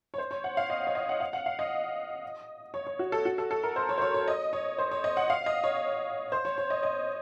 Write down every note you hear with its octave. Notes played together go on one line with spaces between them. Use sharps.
C#5
C5
C#5
F#5
F5
D#5
C#5
D#5
F#5
F5
F#5
F5
D#5
C#5
C#5
F#4
A4
F#4
A4
A4
A#4
C5
C#5
C5
C#5
C#5
D#5
C#5
C5
C#5
D#5
F#5
F5
D#5
C#5
C5
C#5
C#5
D#5
D#5